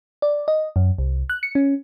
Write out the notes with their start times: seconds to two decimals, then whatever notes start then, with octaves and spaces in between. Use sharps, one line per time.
0.22 D5
0.48 D#5
0.76 F#2
0.98 C2
1.30 F#6
1.43 C#7
1.55 C#4